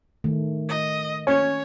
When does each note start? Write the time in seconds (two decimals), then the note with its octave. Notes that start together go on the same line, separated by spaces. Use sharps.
0.24 D#3 A3
0.69 D#5
1.27 C#4 C#5